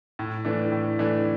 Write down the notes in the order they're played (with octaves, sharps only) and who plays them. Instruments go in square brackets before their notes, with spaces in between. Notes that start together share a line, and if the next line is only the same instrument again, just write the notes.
[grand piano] A2
E3 A3 D4
A2
E3 A3 D4